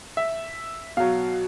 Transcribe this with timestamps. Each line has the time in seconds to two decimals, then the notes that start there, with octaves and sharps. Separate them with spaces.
0.17 E5
0.97 B2 F#3 F5